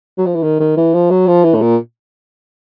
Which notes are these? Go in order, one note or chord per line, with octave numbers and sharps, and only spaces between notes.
F#3
F3
E3
D#3
D#3
E3
F3
F#3
F3
E3
A2
A#2